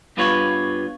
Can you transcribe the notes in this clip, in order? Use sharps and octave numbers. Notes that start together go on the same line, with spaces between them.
G2 G3 B3 F4 B4 C#5